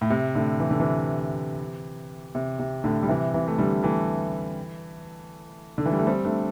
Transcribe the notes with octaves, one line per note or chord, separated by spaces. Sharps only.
A2
C3
A2 D3
E3
D3
C3 E3
C3
C3
A2 D3
G3
C3 E3
C3 E3
A3
D3 G3
E3 A3
D3
E3
G3
A3
G3 C4
A3 D4